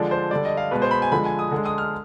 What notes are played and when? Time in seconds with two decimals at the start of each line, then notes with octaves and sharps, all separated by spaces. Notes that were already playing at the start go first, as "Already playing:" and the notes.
Already playing: D3 F3 G#3 D5
0.11 C5
0.31 D3 G3 D5
0.45 D#5
0.57 F5
0.71 B2 G#3 B4
0.82 C5
0.91 B5
1.02 G#5
1.12 D3 F3 G#3 B5
1.25 G#5
1.39 D#6
1.51 D3 G#3
1.65 D#6
1.78 F6